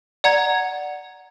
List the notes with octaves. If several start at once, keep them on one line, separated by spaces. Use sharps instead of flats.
D5 F#5 A#5 G#6